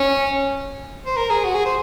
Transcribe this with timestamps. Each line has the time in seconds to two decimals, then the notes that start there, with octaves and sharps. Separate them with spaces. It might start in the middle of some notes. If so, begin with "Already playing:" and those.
Already playing: C#4
1.06 C5
1.17 A#4
1.30 G#4
1.45 F#4
1.55 G#4
1.65 C5